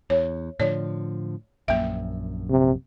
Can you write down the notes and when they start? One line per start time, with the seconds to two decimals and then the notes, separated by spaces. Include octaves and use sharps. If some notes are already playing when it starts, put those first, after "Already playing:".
0.10 E2 C#5
0.60 A2 D3 F3 C#5 D5
1.68 A#1 F#2 A#3 E5
2.50 C3